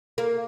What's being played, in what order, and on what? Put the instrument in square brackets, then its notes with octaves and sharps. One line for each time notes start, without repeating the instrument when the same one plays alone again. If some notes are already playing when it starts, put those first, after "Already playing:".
[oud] A#3